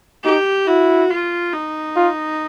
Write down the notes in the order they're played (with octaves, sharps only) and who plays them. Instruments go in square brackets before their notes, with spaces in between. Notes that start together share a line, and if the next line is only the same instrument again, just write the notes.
[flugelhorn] D#4 [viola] G4
[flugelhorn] E4 [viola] F#4
[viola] F4
D#4
[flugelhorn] F4